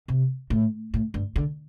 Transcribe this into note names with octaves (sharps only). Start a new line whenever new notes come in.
C3
A2
A2
G2
D3